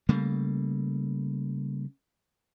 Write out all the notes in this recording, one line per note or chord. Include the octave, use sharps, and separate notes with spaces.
C#3 G3 A3 A#3